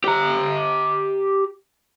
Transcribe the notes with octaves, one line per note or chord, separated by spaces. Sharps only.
G4 A#5